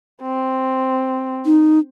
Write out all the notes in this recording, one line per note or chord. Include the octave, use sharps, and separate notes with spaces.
C4
D#4